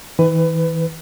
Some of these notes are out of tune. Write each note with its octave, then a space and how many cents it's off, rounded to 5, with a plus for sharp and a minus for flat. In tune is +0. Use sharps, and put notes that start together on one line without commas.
E3 -40 B4 +20